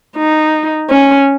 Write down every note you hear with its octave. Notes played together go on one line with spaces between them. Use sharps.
D#4
C#4